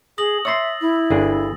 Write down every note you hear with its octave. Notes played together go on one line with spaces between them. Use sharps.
G#4 D#6 A#6 F#7
C#5 E5 C6 E6 A6 A#6
E4
G1 D4 G#4 D5